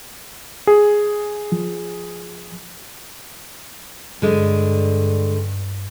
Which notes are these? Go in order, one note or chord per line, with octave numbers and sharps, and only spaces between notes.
G#4
F3
G2 D3 G#3